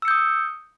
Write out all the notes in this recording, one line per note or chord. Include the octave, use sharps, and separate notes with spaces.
D#6 E6 G6 C#7